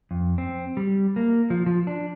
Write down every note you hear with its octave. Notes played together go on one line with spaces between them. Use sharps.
F2
C4
G3
A#3
F3
F3
D4